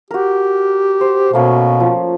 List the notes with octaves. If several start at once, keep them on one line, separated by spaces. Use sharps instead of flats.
F#4 G4 A#4
C5
B2 A3 A#3 C#4
F3